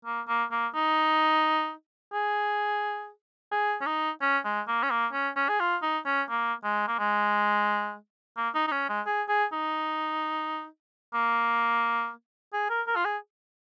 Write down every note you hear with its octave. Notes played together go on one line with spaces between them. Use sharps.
A#3
A#3
A#3
D#4
G#4
G#4
C#4
D#4
C#4
G#3
A#3
C#4
A#3
C#4
C#4
G#4
F4
D#4
C#4
A#3
G#3
A#3
G#3
A#3
D#4
D#4
C#4
G#3
G#4
G#4
D#4
A#3
G#4
A#4
A#4
F4
G#4